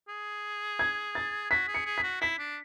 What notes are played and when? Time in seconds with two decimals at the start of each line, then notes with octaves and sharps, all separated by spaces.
0.08 G#4
0.79 G#6
1.15 A6
1.50 F#4 B6
1.68 G#4
1.74 C#7
1.86 G#4
1.98 B6
2.03 F#4
2.21 E4 B6
2.39 D4